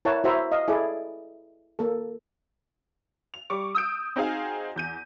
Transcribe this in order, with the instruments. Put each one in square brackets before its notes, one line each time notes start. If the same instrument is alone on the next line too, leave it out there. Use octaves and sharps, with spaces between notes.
[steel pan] E4 A#4 C#5 D5 F#5 A5
E4 F#4 C5 E5 A#5
D#5 F5
E4 G#4 A4 D5
A#3 A4
[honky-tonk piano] F7
G3 C#6 D6
D#6 E6 G6 D7
C4 D#4 F#4 G#4 F5 G#5
E2 G6 D#7